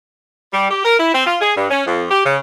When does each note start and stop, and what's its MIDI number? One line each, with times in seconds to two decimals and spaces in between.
0.53 0.69 55
0.71 0.84 67
0.85 0.99 70
1.00 1.13 64
1.14 1.25 60
1.26 1.36 65
1.41 1.54 68
1.56 1.68 43
1.70 1.83 61
1.87 2.04 41
2.10 2.23 67
2.26 2.38 49